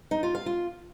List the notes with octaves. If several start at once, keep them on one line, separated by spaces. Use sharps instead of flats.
D#4
F4
F5
F4